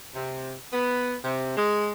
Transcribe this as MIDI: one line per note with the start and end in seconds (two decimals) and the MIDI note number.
0.15 0.55 48
0.73 1.15 59
1.23 1.56 48
1.57 1.91 56